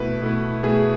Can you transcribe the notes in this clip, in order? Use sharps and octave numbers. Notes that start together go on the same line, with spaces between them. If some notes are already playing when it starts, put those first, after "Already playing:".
Already playing: B2 A3 E4 B4
B2 A3 E4
B2 A3 E4 G#4